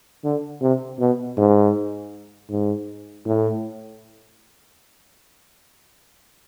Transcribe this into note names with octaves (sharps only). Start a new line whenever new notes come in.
D3
C3
B2
G#2
G#2
A2